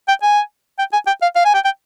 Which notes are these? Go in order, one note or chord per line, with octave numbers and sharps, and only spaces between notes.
G5
G#5
G5
G#5
G5
F5
F5
G#5
G5
G5